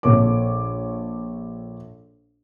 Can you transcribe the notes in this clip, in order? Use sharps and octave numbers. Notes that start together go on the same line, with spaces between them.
A#1 A4 C#5 D6